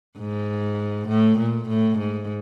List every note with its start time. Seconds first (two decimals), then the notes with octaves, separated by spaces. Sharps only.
0.19 G#2
1.08 A2
1.39 A#2
1.68 A2
1.98 G#2